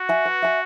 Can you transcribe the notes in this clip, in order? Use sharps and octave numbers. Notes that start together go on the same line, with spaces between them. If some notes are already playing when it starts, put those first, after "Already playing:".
Already playing: F#4
E5 G#5
B4
E5 G#5